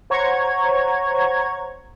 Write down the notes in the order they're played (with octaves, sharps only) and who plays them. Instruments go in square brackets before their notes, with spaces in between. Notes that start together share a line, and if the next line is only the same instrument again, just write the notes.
[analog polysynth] C5 C#5 F#5 A#5 C#6 G#6